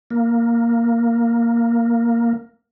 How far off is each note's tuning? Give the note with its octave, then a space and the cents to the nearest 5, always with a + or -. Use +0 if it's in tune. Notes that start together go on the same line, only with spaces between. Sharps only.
A#3 +0